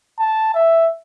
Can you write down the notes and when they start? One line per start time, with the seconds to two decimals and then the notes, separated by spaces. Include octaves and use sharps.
0.19 A5
0.55 E5